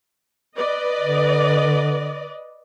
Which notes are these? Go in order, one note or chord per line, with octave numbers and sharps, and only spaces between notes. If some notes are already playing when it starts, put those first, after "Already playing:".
B4 D5 D#5
D3